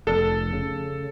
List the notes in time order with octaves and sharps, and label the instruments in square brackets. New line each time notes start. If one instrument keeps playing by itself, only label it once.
[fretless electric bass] F1 [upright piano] A4
[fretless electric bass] C#3